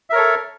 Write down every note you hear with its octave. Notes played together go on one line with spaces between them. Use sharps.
A4 A#4 C#5 E5